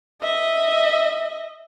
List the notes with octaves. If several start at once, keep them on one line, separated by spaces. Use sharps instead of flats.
D#5 E5